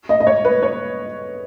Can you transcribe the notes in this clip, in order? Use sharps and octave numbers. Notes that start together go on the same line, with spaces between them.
D#5
D#5
C#5
B4
C#5